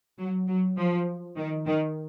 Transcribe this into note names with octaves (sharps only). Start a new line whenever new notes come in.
F#3
F#3
F3
D#3
D#3